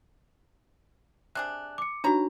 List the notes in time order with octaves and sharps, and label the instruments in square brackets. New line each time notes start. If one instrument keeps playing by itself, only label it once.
[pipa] C3 D4 G#4 [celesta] F#6
[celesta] D6 C#7
[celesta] D4 D#4 F#4 [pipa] B4 C#5 A#5